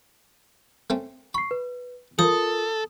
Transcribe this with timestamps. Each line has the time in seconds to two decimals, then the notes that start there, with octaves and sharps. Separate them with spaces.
0.90 A3 C4 C#4
1.34 B5 C#6 C7
1.51 B4
2.19 F3 F4 A4 A#4 D#6